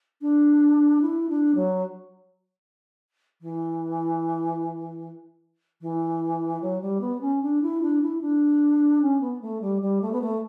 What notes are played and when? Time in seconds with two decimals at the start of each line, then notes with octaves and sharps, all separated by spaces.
0.21 D4
1.01 E4
1.29 D4
1.55 F#3
3.41 E3
5.81 E3
6.61 F#3
6.81 G3
7.01 B3
7.21 C#4
7.42 D4
7.62 E4
7.82 D4
8.02 E4
8.21 D4
9.02 C#4
9.21 B3
9.42 A3
9.61 G3
9.82 G3
10.02 A3
10.12 B3
10.22 A3